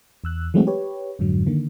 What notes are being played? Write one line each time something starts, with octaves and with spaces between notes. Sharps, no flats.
E2 E6 F#6
E3 F#3 G#3 A3 C4 F#4
G4 B4 C#5
F2 G#2 D3 F#3
D3 D#3 A#3